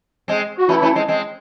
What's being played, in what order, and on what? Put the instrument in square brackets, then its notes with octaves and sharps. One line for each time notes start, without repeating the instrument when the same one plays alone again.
[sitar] G#3 C4
[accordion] F#4
[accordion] E3 E4 [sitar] A3 C#4
[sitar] A3 C#4
G#3 C4
G#3 C4